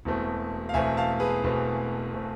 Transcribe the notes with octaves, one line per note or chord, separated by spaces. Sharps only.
E1 E2 B2 A3 C4
F5
E1 E2 B2 A3 C4 E5 G#5
F5 A5
G#4 B4
E1 E2 B2 A3 C4
B2 A3 C4